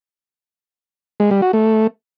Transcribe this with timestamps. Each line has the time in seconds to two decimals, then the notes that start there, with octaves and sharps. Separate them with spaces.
1.20 G#3
1.31 G3
1.42 F#4
1.53 A3